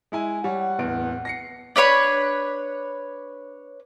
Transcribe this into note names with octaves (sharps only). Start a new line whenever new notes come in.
G#3 E4 G#5
G3 C#5 F#5
D1 E2 D7
A#6 C7 C#7
D4 B4 C#5 B5